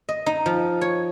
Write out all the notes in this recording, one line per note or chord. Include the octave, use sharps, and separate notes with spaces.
D#5
D#4
F3
C#5